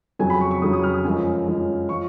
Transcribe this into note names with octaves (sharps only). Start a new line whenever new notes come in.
F2 C#3 F#3 G#5
B5
C#6
C#6
F2 C#3 F#3 D#6
D#6
F6
D#6
F#2 F3 G#3
F#2 F3 G#3
F3 G#3 C#6